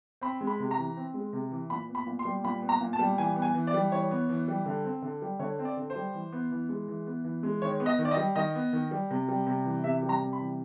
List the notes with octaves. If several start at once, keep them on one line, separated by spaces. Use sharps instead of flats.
C4 B5
G#3
B5
C3
A#5
E3
C4
G#3
C3
E3
A#2 B5
B3
B5
A#2
C6
G3
A#2 B5
B3
A#5
A#2
A5
G3
E3 G#5
B3
G#5
E3
D5
G3
E3 C#5
B3
E3
G3
D3
C4
D3
G3
D3 C#5
C4
D5
D3
C5
G3
E3
B3
E3
G#3
E3
B3
E3
G#3
D#3 C#5
B3
D#5
D#3
D5
D#5
G3
D#3 D#5
B3
D#3
G3
C3
G3
C3
E3
C3 E5
G3
A#5
C3
B5
E3